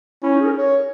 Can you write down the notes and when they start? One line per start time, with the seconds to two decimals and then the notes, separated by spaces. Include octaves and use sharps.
0.23 C#4 E4
0.35 D#4
0.41 G#4
0.46 A#4
0.58 C#5